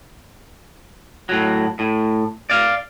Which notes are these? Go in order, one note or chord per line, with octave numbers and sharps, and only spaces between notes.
A2 F#3
A2
D5 F5